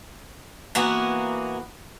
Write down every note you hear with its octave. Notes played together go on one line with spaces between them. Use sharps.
E3 A#3 B3 F#4